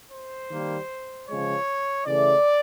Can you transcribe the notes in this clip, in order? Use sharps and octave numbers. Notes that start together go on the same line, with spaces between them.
C5
D#3 G3 A#3
C#3 F3 G#3 C#5
C#3 E3 A3 D5